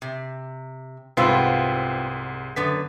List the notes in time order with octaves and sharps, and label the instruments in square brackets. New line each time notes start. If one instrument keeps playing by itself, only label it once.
[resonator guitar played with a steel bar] C3
[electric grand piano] C2 G#2 E6 [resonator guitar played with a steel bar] B3 C4 F4
[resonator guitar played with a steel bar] F#2 D3 B3 [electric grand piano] B6